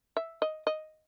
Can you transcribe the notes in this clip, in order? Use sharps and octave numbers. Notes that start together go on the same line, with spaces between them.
E5
D#5
D#5